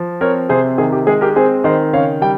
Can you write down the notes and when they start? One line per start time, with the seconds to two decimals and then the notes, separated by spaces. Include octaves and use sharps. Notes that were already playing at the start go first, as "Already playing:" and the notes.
Already playing: F3
0.21 C4 A#4 C#5
0.49 C3 G#4 C5
0.78 D#3 G#4
0.92 G4
1.07 G#3 G#4
1.21 G4 A#4
1.36 C4 G#4 C5
1.64 D#3 C5 D#5
1.93 C#3 C#5 F5
2.22 G3 G5